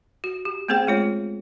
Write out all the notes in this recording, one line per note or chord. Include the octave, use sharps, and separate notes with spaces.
F#4
G4
A3 B3 C4 G#4 C5 G5
G#3 F4 C#5